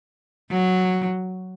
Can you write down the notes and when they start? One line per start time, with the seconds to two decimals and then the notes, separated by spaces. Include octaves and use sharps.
0.51 F#3